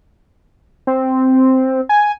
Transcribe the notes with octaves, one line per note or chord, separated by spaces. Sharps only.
C4
G#5